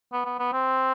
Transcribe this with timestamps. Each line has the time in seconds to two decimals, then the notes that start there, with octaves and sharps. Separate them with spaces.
0.13 B3
0.25 B3
0.39 B3
0.53 C4